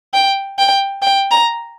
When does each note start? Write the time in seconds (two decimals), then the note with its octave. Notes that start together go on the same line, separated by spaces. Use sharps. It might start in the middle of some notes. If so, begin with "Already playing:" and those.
0.14 G5
0.59 G5
1.02 G5
1.32 A#5